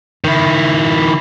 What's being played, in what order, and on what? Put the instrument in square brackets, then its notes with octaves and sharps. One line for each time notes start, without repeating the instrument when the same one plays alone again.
[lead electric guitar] D#3 E4